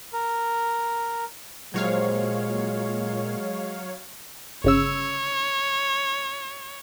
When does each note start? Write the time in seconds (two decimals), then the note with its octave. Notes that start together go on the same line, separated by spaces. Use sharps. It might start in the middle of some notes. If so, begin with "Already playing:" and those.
0.13 A#4
1.74 A#2 F3 F#3 G#3 G4 C5 C#5 F5
4.64 G1 C#3 C#5 E6